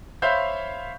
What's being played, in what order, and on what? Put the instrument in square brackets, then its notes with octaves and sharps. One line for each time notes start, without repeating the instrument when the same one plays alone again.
[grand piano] C5 C#5 E5 F5 B5 G6